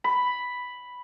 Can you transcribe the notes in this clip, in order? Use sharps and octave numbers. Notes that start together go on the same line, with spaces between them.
B5